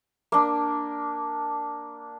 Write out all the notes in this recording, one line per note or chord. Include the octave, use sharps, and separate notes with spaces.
A#3 D4